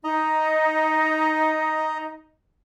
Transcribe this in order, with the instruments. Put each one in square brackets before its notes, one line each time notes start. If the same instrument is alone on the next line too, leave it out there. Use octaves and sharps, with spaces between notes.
[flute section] D#4 [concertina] D#5 A#5